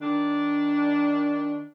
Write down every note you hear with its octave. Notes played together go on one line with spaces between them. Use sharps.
D#3 D4